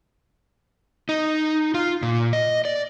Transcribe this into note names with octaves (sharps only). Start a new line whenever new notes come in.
D#4
F4
A#2
D#5
D5